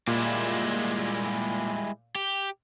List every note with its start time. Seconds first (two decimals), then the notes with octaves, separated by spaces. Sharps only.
0.07 A#2 G3 G#3 E4
2.15 G4